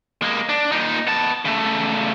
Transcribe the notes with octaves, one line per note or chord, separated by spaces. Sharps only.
G#3 A#3
D4
A#2 D#4
B3 A5
C#3 A3